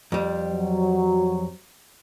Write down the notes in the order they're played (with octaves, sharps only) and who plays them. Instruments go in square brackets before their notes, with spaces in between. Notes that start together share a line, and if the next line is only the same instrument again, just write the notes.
[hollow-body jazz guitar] F2 G3
[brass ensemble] F#3